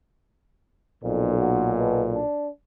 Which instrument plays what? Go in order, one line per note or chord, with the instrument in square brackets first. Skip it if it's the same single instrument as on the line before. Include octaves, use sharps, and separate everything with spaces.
[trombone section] B1 A#2 [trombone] F2
[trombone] F#4
B2
D4